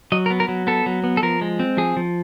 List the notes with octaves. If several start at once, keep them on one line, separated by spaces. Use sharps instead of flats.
F#3 D#5
A#4
B3
A#4
F#3
B3 A4
F#3
B3
A4
F3 A#4
G#3
C4
F3 G#4
F3